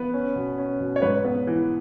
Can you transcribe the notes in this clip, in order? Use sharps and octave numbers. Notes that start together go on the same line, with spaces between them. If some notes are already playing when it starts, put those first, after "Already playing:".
Already playing: B3 B4
C#4
B2
C#4
B2
C#5
G#2 B4
B3
E3